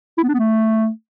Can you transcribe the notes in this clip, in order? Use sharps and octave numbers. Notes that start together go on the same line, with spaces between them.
E4
B3
D4
B3
A3